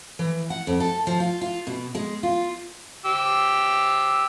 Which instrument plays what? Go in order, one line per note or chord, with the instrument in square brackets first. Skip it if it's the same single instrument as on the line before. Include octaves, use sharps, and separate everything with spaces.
[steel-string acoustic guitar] E3
F#5
F2
A4
F3
F4
F4
B2
G#3
F4
[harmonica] G4 E6